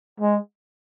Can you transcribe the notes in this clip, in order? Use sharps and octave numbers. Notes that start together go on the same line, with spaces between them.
G#3